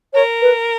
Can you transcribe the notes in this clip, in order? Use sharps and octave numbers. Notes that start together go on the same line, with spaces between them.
A#4 C#5
B4